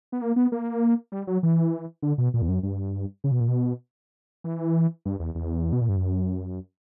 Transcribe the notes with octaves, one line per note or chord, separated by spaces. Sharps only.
B3
A#3
B3
A#3
G3
F#3
E3
D3
B2
A#2
E2
F#2
G2
C#3
B2
A#2
B2
E3
G2
E2
E2
B2
A#2
G2
F#2